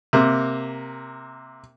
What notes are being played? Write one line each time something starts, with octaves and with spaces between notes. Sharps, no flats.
C3 A#3